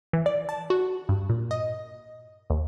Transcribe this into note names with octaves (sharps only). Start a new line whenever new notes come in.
E3
D5
A5
F#4
G2
A#2
D#5
D#2